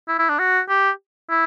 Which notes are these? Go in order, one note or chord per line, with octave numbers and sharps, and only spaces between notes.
E4
E4
D4
F#4
G4
E4